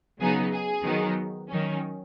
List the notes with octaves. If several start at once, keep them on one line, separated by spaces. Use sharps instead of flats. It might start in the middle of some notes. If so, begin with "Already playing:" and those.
C#3 F#3 B3 D#4 G#4
G#4
D#3 F#3 B3 D#4
D#3 F#3 C#4